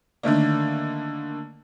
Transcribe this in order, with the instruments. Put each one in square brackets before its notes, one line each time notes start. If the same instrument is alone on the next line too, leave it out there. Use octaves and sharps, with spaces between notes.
[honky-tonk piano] D3 D#3 A3 A#3